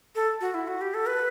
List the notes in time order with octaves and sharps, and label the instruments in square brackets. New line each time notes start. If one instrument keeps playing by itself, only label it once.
[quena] A4
F#4
E4
F#4
G4
A4
B4